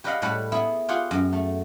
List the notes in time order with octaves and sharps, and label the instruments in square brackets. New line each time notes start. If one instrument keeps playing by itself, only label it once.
[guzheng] G4 B4 D5 D#5 F5 F#5
A2 G3 B4 F#5 A5
B3 E4 G#4
F4 G4 G#4 F#5
F#2
A3